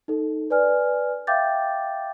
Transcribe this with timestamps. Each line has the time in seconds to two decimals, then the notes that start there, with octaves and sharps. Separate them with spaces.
0.08 D#4 A4
0.50 B4 D5 G#5 F6
1.27 E5 F5 G5 D6 G6 A6